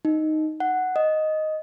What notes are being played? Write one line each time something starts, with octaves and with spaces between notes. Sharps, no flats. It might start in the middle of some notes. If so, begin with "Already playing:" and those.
D#4
F#5
D#5